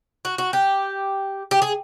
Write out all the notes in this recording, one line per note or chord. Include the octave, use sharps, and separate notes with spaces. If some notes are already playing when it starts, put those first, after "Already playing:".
F#4
F#4
G4
G4
G#4